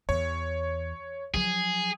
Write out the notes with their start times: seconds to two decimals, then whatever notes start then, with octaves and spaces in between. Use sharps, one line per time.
0.09 E2 C#5
1.34 F3 F#3 G#4